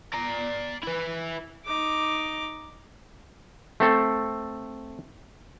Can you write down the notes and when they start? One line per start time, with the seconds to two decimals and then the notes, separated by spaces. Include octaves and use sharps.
0.14 D5 A#5
0.83 E4 B4
1.65 D#4 D6
3.80 A3 C4 A4